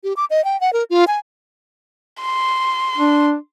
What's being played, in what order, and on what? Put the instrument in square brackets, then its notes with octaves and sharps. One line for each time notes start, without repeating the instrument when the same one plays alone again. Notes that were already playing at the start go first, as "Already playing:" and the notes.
[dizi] G4
D6
D#5
G5
F#5
A#4
F4
G#5
[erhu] C6
[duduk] D4